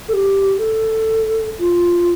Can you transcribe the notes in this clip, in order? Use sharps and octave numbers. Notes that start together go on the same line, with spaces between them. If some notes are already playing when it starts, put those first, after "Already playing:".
A4
G4
A4
F4